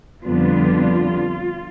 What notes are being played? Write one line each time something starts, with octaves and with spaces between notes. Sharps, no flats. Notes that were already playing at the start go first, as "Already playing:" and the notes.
F2 D3 G3 B3 D4 F4